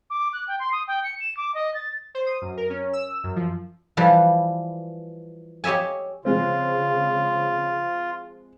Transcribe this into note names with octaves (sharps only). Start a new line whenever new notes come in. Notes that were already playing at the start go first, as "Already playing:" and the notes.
D6
F#6
G5
C6
D#6
G5
C#7
E7
D6
D#5
A6
C5
D#6
F#2
A#4
C#4
E6
F#2
F3
E3 F3 G3 B4
G4 C#5 D#5 E5 G#5
C#3 F3 G#3 C4 F4